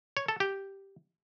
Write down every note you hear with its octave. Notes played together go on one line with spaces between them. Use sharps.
C#5
A4
G4